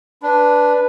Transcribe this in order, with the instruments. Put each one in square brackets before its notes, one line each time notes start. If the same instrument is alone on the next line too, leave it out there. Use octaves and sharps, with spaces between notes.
[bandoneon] D4 [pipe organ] B4